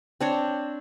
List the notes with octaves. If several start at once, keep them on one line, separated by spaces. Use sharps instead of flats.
C4 D4 C#5